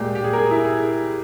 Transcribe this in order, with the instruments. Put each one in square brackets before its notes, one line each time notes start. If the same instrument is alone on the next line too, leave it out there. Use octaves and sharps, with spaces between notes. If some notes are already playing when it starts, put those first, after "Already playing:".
Already playing: [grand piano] A#2 G#3 G4
G4
G#4
A#4
G#4
E4
G#4